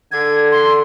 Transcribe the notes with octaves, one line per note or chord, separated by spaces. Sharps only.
D3 G#6
C6